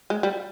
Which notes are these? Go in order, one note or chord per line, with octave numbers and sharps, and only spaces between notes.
G#3
G3